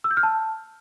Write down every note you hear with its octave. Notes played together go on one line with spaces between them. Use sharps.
E6
G6
F6
A5